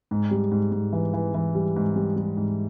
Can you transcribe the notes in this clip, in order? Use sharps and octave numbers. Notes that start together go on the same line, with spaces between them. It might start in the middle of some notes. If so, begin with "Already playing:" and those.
G#2
G3
G#2
G#2
E3
E3
E3
G3
G#2
G3
G3
G#2